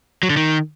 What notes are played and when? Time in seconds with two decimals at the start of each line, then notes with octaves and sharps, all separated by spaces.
0.23 F#3
0.30 D3
0.37 D#3